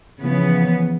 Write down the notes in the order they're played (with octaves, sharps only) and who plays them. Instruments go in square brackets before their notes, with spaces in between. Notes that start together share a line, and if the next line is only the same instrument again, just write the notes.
[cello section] C#3 E3 F3 B3